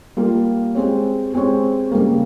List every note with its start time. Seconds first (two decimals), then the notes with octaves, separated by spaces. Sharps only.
0.17 G3 A#3 F4
0.75 G#3 C4 G4 C#5
1.34 G#3 C4 G4 C#5
1.92 C#3 G3 A#3